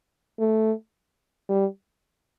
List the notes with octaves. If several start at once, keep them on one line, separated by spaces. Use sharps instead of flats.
A3
G3